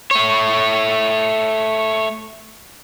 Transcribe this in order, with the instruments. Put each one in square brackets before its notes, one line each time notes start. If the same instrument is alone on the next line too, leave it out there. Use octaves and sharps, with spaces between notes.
[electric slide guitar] A3 C#5